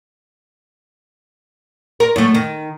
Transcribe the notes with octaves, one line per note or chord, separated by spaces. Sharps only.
A#4
F#2 A3
D#3